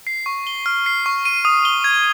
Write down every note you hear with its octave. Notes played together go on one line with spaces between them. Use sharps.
C7
C#6
G7
F6
C7
C#6
D#7
D#6
G7
G#6